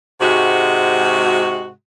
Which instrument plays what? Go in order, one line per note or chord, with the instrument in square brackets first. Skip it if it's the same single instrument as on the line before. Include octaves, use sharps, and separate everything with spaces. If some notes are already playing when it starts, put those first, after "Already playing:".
[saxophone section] G#2 C3 G#3 F#4